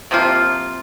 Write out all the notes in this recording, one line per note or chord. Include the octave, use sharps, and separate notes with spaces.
C3 F3 A#3 F4